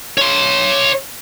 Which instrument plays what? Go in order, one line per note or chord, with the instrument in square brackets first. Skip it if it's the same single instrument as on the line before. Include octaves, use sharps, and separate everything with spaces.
[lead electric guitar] C#5 C6